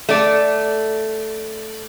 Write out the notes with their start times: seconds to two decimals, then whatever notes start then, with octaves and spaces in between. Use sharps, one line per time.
0.09 A3 D5